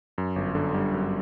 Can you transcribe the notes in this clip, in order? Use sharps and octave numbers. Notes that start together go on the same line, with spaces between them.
F#2
G1
D3
G3
F#2